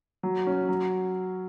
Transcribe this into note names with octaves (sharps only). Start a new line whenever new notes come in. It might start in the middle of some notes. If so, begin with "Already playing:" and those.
F#3
C#4
F#3